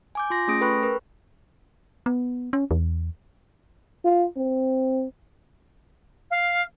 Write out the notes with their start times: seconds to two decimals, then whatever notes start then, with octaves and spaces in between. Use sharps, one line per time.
0.15 G#5 D6 G6
0.30 F4 C6 A#6
0.48 A3 C#4 G#4 D#6 A#6 D7
0.61 A4 B4 G5 B5 C#6 F#6
0.83 A#4 B4
2.06 B3
2.53 C#4
2.71 E2
4.05 F4
4.37 C4
6.31 F5